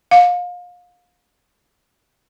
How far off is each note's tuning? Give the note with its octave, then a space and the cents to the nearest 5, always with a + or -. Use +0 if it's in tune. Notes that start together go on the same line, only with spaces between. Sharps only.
F5 +30